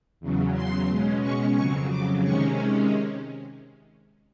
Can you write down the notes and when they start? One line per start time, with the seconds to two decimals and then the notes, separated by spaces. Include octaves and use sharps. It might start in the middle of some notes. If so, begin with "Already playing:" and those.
0.20 E2 C#3 F#3
0.54 C6
0.88 B2 G#3 C#4
1.22 C#6
1.55 F2 C#3 F#3 C#6
1.89 D6
2.23 C3 D#3 G#3 C#4 C#6